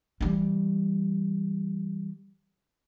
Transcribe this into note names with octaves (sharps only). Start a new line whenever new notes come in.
E3 G3